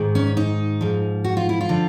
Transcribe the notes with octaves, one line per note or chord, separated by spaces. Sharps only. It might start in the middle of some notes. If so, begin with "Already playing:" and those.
Already playing: G#2 D#3
C#4
D#4
G#2 F3
F#4
F4
E4
F4
D3 F3